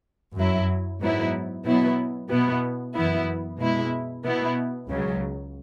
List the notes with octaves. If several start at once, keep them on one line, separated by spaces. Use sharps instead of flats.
F#2 F#3 E4
G#2 F#3 B3 E4
B2 F#3 B3 E4
B2 B3 E4
F#2 E3 B3 E4
B2 G#3 E4
B2 B3 E4
C#2 C#3 F#3